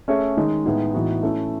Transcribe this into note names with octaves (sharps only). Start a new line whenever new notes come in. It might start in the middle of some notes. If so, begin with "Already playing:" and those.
A3 C#4 G#4 C#5 E5
D#3 G#3 D#4
A2 G#3 B3 D#4 G#4
A2 E3 B3 D#4 F#4
A3 C#4 E4